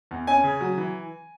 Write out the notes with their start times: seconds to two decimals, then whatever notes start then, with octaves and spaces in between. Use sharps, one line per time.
0.11 E2
0.27 C#4 G#5
0.44 C#3
0.61 F#3
0.78 E3